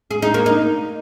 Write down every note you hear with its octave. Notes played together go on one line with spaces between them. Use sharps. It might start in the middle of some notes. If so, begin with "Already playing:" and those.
G#4
D#4
A#3
D#4